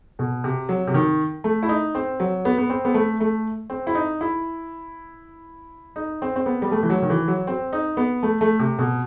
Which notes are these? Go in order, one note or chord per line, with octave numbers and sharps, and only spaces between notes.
B2
C3
F#3
C3
D#3
A3
E4
D#4
C4
F#3
B3
B3
C4
B3
A3
A3
C4
E4
D#4
E4
D#4
C4
C4
B3
G3
A3
E3
F#3
D#3
E3
F#3
C4
D#4
B3
A3
A3
C3
B2